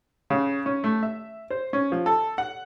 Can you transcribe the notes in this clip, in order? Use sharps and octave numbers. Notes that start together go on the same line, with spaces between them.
C#3
C#4
A3
E5
C5
C#4
F3
A4
F#5